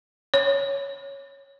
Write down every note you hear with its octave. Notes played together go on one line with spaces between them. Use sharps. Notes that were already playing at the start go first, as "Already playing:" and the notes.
C#5